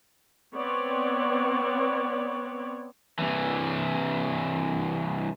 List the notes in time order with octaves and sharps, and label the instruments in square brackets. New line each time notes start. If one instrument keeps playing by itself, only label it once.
[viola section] B3 C4 C#5 D5
[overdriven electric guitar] C2 E3